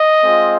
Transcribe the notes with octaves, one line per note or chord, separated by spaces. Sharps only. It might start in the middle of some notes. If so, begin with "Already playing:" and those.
Already playing: D#5
G#3 C4 F4